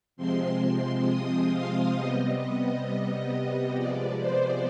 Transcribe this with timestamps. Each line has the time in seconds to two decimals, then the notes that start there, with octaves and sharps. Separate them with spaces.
0.17 C3 F3 G#3 C4 C6
0.61 C6
1.06 D#6
1.50 F5
1.94 C3 G3 B3 D#5
3.73 C3 F3 G#3 B3 D5
4.18 C5